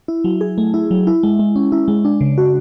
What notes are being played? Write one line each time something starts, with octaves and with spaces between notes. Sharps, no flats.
E4
F#3
G#4
A3
E4
F#3
E4
G#3
G#3
C#4
E4
G#3
D4
C#3
F#4